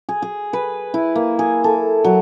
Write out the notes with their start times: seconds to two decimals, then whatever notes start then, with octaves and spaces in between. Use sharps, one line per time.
0.09 G#4
0.22 G#4
0.53 B4
0.94 E4
1.15 A#3
1.39 G#4
1.64 A4
2.04 F#3